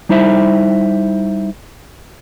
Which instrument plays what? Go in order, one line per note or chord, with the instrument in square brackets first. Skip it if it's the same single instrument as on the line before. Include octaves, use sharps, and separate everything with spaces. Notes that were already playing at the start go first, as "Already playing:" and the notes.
[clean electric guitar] G3 D#4 E4 C5 E5